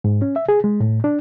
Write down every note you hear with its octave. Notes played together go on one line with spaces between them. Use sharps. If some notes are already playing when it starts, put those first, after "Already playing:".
G#2
C#4
E5
G#4
G#3
A2
D4